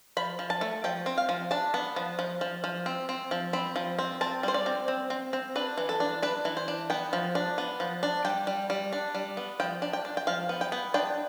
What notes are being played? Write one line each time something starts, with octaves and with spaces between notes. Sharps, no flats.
F3 B5
F3
A5
A3
F3 G5
C4
F5
F3
D4 A5
B3
F3
F3
F3
F3
C4
C4
F3
C4 B5
F3
C4
C4 A5
G3 C5
D5
C4
C4
C4
C4
D4 B4
E3
A4
D4
D4 B4
E3
C5
D4
B3 G5
F3
D4
B3
F3
D4
G3 G5
G3
G3
D4
G3
B3
F3 G5
D4
G5
D4
G5
F3 F5
B3
G5
B3
D4 G5